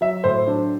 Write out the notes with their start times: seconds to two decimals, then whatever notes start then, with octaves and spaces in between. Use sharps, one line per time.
0.01 F#3 E5
0.24 A2 C5
0.47 F#3 D4